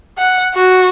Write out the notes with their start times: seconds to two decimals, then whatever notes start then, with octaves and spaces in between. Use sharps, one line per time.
0.18 F#5
0.55 F#4